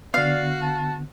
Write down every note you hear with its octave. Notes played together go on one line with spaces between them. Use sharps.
D3 B3 F#4 D5 F5
A5